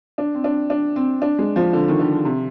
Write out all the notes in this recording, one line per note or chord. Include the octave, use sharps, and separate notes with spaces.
D4
C4
D4
D4
C4
D4
G#3
F3
D3
D#3
D3
C3